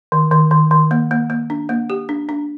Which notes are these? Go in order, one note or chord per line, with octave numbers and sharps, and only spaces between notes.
D#3
D#3
D#3
D#3
A#3
A#3
A#3
D4
A#3
G4
D4
D4